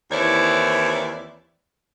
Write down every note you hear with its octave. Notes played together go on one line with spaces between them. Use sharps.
D#2 E3 C4 E4 C#5 D5